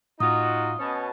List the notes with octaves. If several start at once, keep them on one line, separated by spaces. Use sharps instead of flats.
A2 D#4 F4 F#4 D#6
B2 C#4 A5